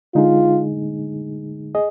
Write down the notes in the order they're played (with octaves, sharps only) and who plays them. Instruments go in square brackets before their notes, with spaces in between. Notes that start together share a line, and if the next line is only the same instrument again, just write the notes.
[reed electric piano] D3 G#3 D#4 G#4 [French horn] F4
[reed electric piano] G#4 D#5